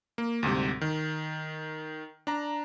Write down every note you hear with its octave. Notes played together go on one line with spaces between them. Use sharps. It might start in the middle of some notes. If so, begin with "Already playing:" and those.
A#3
D2 G#2 C3 G3
D#3
D4 A#5